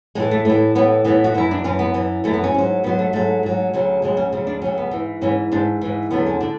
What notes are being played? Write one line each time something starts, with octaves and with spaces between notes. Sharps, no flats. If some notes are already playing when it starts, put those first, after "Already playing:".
A2 E3 G#3
A3
A2 E3 A3
A2 E3 B3
A2 E3 B3
F#4
F#2 E3 E4
D4
F#2 E3 C#4
B3
F#2 E3
F#2 E3 A3
B3
C#4
G#2 F#3
G#2 F#3 B3
A3
G#2 F#3 A3
G#2 F#3
D2 C#3 F#3
D2 C#3 F#3 G#3
C#4
D2 C#3 F#3
D4
D2 C#3 F#3 C#4
B3
G#2 E3
G#2 E3 C#4
G#2 E3 D4
G#2 E3
E2 D3 F#3 B3
C#4
D3 D4